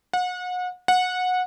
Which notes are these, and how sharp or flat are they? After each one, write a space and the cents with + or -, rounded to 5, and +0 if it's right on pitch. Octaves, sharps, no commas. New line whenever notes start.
F#5 -35
F#5 -20